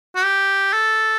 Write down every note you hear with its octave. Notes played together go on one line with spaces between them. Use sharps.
F#4
G4
A4